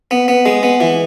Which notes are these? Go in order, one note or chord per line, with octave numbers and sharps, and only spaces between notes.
B3
B3
G#3
B3
E3